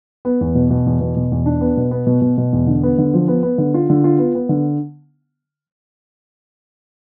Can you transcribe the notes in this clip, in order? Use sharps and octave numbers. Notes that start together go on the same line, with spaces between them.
B3
E2
B2
B2
E2
B2
B2
E2
D4
B3
B2
B3
B2
B2
B2
E2
D3
B3
D3
F3
B3
B3
D3
F4
D3
F4
B3
B3
D3